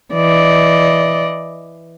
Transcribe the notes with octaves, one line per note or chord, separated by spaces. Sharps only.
E3 D5 D#5